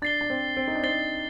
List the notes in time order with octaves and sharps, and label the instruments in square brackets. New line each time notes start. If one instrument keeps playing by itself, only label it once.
[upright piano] D4 [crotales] A6 C7 G7
[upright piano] D4
C4
C4
D#4
D4
[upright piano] C4 [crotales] A6 C7 G7